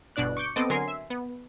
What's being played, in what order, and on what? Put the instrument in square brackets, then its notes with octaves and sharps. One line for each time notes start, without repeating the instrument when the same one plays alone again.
[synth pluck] G1 B2 D4 D5 F#6
C#6 D6 G6 C#7
B3 C4 A4 D#5 D6
D3 F#3 A#4 G#5 C6 C7
E5
B3